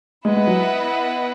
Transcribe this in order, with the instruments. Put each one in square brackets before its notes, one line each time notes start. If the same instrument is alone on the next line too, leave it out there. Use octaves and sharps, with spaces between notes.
[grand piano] G#3 [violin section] B3 E4 B4 D#5 F#5
[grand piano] G#3
F#3